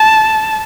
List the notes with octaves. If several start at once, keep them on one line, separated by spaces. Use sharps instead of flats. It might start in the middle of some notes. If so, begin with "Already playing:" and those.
Already playing: A5